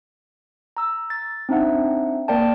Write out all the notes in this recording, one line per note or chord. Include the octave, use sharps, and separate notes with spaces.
A#5 E6
A6
C4 D4 D#4 E5 F#5
A#3 A#4 D5 G5 A5